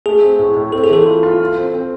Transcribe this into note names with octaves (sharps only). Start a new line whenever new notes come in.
A3 G#4
C4
A2
A2
C4 A4
G#4
E3 A4
F4
F4
F4
C4
C4